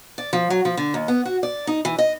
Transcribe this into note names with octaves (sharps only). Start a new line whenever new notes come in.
D5
F3
F#3
F3
D3
D#2
B3
F#4
D5
D#4
E3
D#5